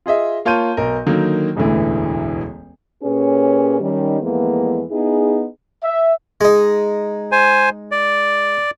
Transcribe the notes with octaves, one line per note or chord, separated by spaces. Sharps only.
F4 G#4 D#5 E5
A#3 F4 C#5 A5 G6 D#7
B1 A#4
D3 D#3 F#3 A#3
E1 A1 D2 D3 E3
A#2 C#4 G4 G#4 B4 C#5
D#3 G3 C#4
F2 E3 G#3 A#3 B3
B3 D#4 E4 G#4
E5
G#3 D#4
C5 G#5
D5